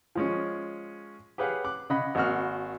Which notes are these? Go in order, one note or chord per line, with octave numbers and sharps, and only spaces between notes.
F3 G#3 C#4
G4 G#4 B4 C#5 F5 F#5
D6 F#6
C#3 D#5 F#5 B5
G#1 A#3 F#4 F6